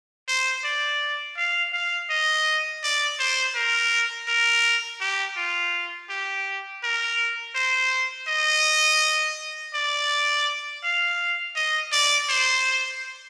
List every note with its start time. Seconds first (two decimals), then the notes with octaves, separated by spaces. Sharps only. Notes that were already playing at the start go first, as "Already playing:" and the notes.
0.28 C5
0.64 D5
1.37 F5
1.73 F5
2.10 D#5
2.83 D5
3.19 C5
3.55 A#4
4.28 A#4
5.00 G4
5.37 F4
6.09 G4
6.83 A#4
7.55 C5
8.28 D#5
9.74 D5
10.83 F5
11.56 D#5
11.92 D5
12.29 C5